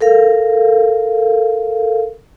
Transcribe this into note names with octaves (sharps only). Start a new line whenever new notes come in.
A4 A#4 F5